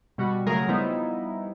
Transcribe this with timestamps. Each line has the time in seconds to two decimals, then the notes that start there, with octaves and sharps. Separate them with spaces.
0.18 B2 G3 F#4
0.46 C#3 F#3 A3 G#4 A#4
0.68 F3 G3 B3 D#4 E4